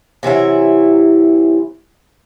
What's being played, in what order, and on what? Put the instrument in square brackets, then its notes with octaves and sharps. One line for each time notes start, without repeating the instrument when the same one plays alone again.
[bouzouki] C3 E3 F#3 E4